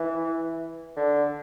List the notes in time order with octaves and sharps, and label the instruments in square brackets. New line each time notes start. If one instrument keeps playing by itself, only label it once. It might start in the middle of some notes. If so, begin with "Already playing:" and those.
Already playing: [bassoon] E3
D3